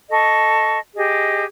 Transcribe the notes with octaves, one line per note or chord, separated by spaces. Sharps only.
A4 D#5 C#6
G4 G#4 D#5